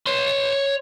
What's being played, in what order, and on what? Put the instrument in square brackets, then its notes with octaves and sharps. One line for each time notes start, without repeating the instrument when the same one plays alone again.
[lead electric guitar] C#5 C6